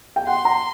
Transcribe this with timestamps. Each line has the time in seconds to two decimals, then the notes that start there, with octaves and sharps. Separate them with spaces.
0.16 G5
0.27 F#5 C6
0.45 A#5